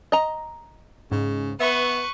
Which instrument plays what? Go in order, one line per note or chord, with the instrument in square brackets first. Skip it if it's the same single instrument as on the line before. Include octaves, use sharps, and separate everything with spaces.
[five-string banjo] D#5 A#5
[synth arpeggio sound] G#2 [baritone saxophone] C#3
[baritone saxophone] B3 [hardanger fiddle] B4 C#6 [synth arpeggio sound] E5